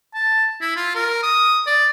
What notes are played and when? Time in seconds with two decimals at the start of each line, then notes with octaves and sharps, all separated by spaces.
0.14 A5
0.61 E4
0.76 F4
0.95 A#4
1.23 D#6
1.66 D5